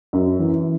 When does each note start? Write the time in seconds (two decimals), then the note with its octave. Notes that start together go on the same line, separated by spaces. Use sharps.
0.13 F#2
0.39 E3